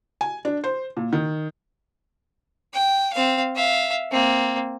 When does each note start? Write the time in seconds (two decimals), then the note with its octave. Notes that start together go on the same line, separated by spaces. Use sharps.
0.21 G#5
0.45 D4
0.64 C5
0.97 A#2
1.13 D#3
2.73 G5
3.13 C4 F5
3.56 E5 F5
4.12 A#3 C4